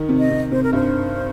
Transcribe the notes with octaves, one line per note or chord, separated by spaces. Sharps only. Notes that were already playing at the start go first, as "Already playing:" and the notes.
Already playing: D#3
C3
D#5
C3
C3 C5
A#4
G2 C5